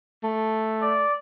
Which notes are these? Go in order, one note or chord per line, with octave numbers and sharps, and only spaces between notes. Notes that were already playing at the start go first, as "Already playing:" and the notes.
A3
D5